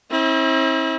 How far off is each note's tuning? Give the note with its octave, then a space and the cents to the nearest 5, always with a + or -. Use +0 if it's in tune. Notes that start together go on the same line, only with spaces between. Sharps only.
C4 +40 E4 -35